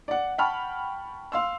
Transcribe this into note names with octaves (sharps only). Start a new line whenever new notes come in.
D5 F#5
F#5 G5 A5 B5 C#6 F6
F5 C6 E6